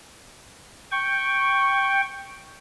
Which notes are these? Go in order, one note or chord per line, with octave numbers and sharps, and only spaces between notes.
G5 C#6